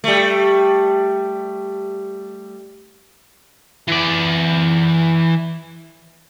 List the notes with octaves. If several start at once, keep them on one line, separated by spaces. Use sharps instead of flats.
G3 A3
E3 D5